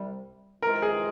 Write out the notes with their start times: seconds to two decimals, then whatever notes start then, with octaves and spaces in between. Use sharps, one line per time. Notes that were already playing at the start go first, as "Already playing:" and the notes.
Already playing: C2 C3 G3
0.62 C3 E3 G#3 C4 F4 A#4
0.82 G#4